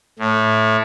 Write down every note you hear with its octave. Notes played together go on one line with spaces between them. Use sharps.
A2